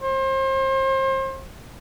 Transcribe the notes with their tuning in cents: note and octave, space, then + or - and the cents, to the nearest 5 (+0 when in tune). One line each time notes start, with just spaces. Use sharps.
C5 +35